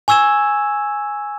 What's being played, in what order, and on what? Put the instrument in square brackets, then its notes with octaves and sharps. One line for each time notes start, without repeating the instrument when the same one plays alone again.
[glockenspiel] G#5 C#6 E6 G#6 E7